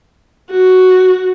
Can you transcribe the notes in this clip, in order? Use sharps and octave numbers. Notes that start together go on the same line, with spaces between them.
F#4